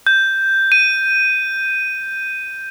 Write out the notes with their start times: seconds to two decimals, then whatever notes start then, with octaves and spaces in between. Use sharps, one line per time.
0.07 G6
0.72 D#7